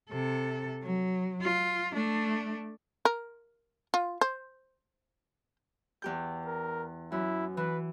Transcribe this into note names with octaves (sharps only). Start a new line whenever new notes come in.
C3 A4
F#3
F4
A3 D4
A#4
F4
C5
E2 G4 G6
A#4
F#2 E4
E3 B4